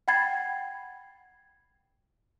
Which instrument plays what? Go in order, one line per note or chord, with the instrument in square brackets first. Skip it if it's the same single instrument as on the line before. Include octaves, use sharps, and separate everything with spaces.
[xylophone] F#5 G5 B5 G#6 A6 C7